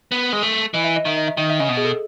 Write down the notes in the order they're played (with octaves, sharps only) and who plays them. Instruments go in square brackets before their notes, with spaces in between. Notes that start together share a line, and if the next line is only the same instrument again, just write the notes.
[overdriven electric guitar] B3
G#3
A3
[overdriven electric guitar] E3 [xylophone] D#5
[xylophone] E5
D#5
[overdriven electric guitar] D#3 [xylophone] E5
[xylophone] D#5
E5
[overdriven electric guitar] D#3 [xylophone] D#5
[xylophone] E5
[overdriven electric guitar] C#3 [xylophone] D#5
[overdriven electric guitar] B2
[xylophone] G#4
A4